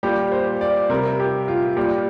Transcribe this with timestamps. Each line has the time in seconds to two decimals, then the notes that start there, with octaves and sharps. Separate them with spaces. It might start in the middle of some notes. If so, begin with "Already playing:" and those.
0.03 A#2 G3 G4
0.32 C5
0.61 D5
0.89 C3 G3 A#4
1.20 G4
1.48 F4
1.77 A#2 G3 G4